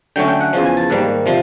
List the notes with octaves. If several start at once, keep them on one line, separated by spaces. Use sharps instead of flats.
D3 F#3 A3 C#4 G5
G5
F#5
E2 C#3 F3
G#5
A5
G#2 D#3 G3 A#3
C3 F3